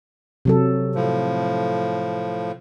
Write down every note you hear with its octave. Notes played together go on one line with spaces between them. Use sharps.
C3 F#3 A4
A2 F3